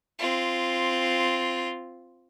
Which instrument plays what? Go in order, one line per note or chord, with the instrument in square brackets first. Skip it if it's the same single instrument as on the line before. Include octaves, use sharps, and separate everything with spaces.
[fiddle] C4 F4